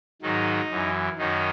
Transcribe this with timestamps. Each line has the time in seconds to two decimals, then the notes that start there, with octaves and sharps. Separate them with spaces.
0.22 G#2 D#3 F#3 D#4
0.70 F#2 E3
1.18 F#2 D#3 F#3 D#4